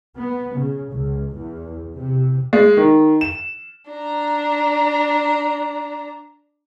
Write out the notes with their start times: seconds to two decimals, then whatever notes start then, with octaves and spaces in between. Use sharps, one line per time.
0.17 B3
0.56 C#3
0.91 C#2
1.34 E2
1.98 C3
2.53 G#3
2.77 D#3
3.21 E7
3.91 D4 A#5